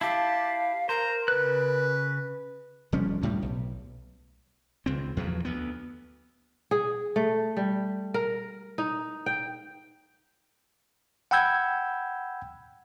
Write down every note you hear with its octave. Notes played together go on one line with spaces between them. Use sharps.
E4 G4 F5 A5
A#4 C5 A#5
C#3 B4 F#6
F1 F3 G3 C#4
D2 A2 G3
B1
C#2 C4
E2 F3 F#3
D2 B3
G#4
A3
G3
A#4
D#4
G5
F#5 G5 B5 E6 G6 G#6